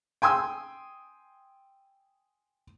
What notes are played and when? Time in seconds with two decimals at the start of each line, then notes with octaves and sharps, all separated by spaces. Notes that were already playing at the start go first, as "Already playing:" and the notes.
0.22 G5 G#5 C6 D#6 E6